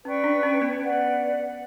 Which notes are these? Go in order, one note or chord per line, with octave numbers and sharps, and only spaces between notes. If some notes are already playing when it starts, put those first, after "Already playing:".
C#4 B4 D5 G5 C#6
D4
C#4
B3
B4 D5 F#5